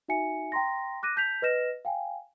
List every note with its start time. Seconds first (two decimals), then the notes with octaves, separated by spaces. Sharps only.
0.08 D#4 F#4 E5 G#5 C#7
0.52 G5 A#5 C6 A#6
1.03 D6 F#6 A#6 D#7
1.16 A5 G6 B6 F7
1.42 B4 D#5 F6 A#6 E7
1.85 F5 G5 G#5